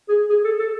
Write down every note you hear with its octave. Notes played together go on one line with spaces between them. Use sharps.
G#4
G#4
A4
A4